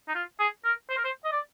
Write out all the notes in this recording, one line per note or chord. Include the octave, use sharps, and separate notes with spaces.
D#4
F4
G#4
A#4
C5
A#4
C5
D#5
D5